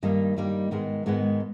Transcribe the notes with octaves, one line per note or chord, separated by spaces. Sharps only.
G2 D#3 G3 A#3 D#4
G2 D#3 G3 A#3 D#4
G#2 D#3 G#3 B3
G#2 D#3 G#3 B3